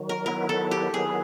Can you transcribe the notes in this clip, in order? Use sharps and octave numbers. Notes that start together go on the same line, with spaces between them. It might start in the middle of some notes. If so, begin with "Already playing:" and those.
Already playing: D#3 F#3
A#4
D#3 F#3 B3 E4 A#4
A4
G4
D#3 F#3 B3 E4 G#4